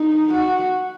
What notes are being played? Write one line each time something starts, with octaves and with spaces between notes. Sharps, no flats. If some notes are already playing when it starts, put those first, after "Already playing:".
Already playing: D#4
F#4